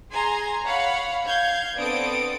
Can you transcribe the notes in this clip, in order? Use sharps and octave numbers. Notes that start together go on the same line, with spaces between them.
G#4 G#5 A#5 C6
C#5 F5 F#5 B5
F5 G6 G#6
B3 C4 D4 A4 D#6 D7